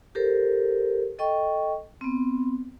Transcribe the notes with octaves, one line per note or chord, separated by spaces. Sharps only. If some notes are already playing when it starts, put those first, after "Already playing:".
G4 A4 A#4 C5
A4 D#5 G5 C#6
B3 C4